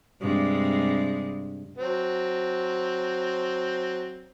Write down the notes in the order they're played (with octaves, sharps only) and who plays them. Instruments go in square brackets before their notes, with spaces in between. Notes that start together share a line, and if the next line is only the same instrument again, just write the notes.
[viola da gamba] G2 C3 G#3
[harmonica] F#3 C4